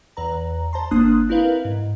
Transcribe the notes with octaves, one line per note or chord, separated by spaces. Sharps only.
E2 B4 A#5
C5 A5 A#5 C6
G1 A#3 D4 C6 D#6 F#6
C4 E4 A#4 B4 F5
G#2